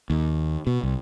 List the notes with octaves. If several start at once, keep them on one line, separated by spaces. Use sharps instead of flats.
D#2
B2
C2